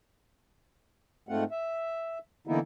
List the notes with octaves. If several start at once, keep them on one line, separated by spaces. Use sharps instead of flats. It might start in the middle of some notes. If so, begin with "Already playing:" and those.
G#2 A3 C4 F4 F#5
E5
D3 E3 A#3 B3 D#4 E4